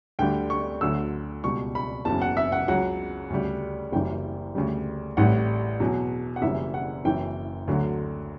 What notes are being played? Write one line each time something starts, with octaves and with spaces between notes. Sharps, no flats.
D2 D3 G3 G5
C#6
D2 D3 F#3 E6
C#2 B2 G3 C#6
B5
F#1 E2 C#3 F#3 A5
F#5
E5
F#5
C#2 C#3 F#3 F#5
D2 C#3 G3
F#1 F#2 E3 G3 G5
D2 C#3 G3
A1 A2 G3 F#5
E2 B2 F#3
F#5
F#1 F#2 C#3 E3 G3 E5
F#5
F#1 F#2 E3 G5
D2 D3 F#3